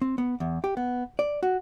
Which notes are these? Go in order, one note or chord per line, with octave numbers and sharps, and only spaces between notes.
C4
B3
E2
G4
B3
D5
F#4